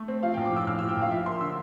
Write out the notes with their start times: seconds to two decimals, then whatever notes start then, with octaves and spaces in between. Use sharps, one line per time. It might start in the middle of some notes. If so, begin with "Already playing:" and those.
Already playing: A3
0.08 C4
0.23 F3 F5
0.34 A#1 G5
0.45 D6
0.52 A2 E6
0.67 A#1 F6
0.79 F3 E6
0.89 G5
0.97 A#1 F5
1.11 F3 E5
1.26 A#3 C6
1.41 D3 E6